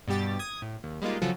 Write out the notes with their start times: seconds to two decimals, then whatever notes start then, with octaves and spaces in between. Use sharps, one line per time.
0.08 G2 B2 G3 G4 A6
0.39 D#6 G#6
0.62 A2
0.84 D#2
1.02 G3 G#3 A#3 D#4 F4
1.22 C#3 F3 F#3 F4 F#4 A4